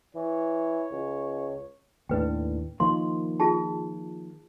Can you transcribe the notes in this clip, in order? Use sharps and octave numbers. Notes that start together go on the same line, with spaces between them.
E3 C#5
C#2
D#2 A2 D4 B4 G5
D#3 F3 A#3 C6
F4 G#4 A5